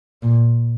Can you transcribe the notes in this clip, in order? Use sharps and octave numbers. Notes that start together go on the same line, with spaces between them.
A#2